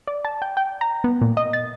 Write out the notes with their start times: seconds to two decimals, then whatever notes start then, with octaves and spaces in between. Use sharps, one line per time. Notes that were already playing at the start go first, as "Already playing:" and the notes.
0.07 D5
0.25 A5
0.42 G5
0.57 G5
0.81 A#5
1.04 B3
1.21 A#2
1.37 D#5
1.53 A6